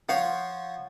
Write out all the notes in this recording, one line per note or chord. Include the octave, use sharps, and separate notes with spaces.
F3 C5 C#5 F5 F#5